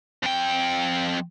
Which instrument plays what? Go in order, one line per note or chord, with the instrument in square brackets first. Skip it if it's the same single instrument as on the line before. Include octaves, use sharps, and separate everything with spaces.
[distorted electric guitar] F2 G5